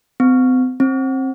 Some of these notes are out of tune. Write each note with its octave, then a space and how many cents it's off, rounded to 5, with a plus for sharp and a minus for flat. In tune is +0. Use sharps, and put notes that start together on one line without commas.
C4 -40
C4 +25